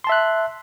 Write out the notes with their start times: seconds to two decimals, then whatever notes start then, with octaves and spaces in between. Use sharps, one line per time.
0.04 C6
0.07 A5
0.09 E5
0.12 F#6